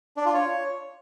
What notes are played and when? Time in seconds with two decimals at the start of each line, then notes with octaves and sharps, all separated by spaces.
0.17 D4
0.26 F4
0.34 C#5